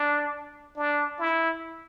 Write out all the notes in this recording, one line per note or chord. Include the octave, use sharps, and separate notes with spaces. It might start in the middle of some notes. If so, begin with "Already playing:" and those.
Already playing: D4
D4
E4